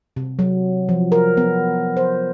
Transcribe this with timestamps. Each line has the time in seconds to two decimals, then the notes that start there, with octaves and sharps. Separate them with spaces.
0.16 C3
0.39 F#3
0.89 F3
1.12 A#4
1.37 B3
1.97 C5